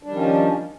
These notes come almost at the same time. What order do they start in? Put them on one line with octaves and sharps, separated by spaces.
D4 G3 D#3 F3 C#4